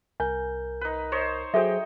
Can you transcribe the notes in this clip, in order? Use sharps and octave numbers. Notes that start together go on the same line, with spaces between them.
C2 A#4 G#5 G6
D#4 B4
C5 C#5 D#5
F#3 F#4 G#4 A4 C5 D#5 E5 G5